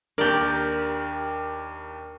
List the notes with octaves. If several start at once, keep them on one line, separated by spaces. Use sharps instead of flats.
D#2 D4 G4 A#4 D5